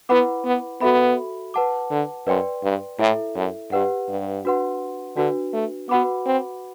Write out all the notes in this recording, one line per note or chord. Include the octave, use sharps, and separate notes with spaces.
B3 E4 B4 F#5 B5 D6
B3
B3 F#4 A4 E5 B5
B4 F#5 A5 D6
D3
F#2 B4 D5 G5 C6
G2
A2 E4 A4 E5
F#2
G2 G4 B4 F#5
G2
D4 F#4 B4 F#5 C6
D3 D4 F#4 B4
A3
B3 F#4 B4 F#5 B5 D6
C4